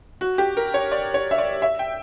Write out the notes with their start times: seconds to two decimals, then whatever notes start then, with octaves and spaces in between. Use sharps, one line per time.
0.21 F#4
0.38 G4
0.57 A#4
0.74 C#5
0.92 D5
1.14 C#5
1.31 E5
1.38 D5
1.62 E5
1.79 G5